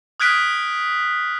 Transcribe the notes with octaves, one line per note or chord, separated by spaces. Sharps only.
D#6 F6 F#6 G#6 B6 D7